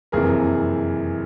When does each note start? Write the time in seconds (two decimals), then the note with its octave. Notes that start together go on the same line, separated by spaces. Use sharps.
0.12 F#1 F2 C3 E3 G#4 A#4